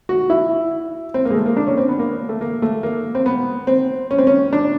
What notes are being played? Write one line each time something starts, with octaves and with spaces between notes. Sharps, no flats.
F#4
E4
C4
A#3
G#3
A3
A#3
D4
C#4
C4
B3
A#3
A3
A#3
A3
A#3
C4
B3
C4
C#4
C4
C#4
D4